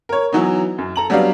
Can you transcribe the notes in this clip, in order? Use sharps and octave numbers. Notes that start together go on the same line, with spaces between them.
A#4 C#5
E3 F#3 B3 D#4
F#2
A4 A#5 F#7
F#3 G3 B3 D4 D5 F5